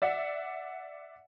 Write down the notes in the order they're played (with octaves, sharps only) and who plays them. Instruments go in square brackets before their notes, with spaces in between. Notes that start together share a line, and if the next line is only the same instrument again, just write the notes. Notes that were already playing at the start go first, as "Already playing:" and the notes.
[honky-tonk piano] D5 E5 F#5